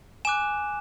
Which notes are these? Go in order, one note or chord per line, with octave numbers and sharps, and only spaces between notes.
G#5 D6 F#6 E7